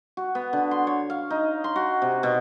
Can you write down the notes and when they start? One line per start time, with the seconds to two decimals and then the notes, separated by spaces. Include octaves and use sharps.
0.17 F#4
0.35 B3
0.53 D3
0.71 C6
0.87 C#5
1.10 F5
1.30 D#4
1.64 C6
1.76 F#4
2.02 C3
2.23 B2